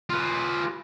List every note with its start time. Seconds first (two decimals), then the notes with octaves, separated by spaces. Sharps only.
0.10 F4 B4